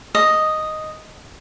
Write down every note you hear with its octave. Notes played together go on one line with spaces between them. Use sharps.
D#5